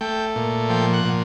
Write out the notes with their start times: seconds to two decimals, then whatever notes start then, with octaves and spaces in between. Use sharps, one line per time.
0.01 A3 G5
0.36 A#2
0.69 F3 G5
0.93 F#5
1.05 A#2